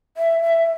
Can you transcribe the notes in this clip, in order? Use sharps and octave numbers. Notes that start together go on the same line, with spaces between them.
E5
E5